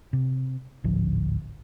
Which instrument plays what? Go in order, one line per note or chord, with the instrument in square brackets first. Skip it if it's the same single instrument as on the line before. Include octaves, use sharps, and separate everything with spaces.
[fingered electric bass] C3
G#1 D2 A2 F3